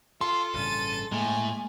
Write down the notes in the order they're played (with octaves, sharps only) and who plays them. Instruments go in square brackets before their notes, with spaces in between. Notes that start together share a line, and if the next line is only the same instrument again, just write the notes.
[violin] F4 [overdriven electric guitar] A4 [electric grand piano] C6
[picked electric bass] A1 G2 C#3 [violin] A6 D#7
[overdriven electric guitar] A2 [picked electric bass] G#3 A#3 [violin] G#5